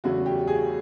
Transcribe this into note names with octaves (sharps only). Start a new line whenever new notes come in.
E2 C#3 F#3 A3 F#4
G4
G#4